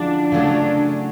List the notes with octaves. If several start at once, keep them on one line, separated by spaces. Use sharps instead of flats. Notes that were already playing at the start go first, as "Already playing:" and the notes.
Already playing: D3 F3 G#3 C#4 D4 E4
C#3 F#3 A3 C#4 D4 F#4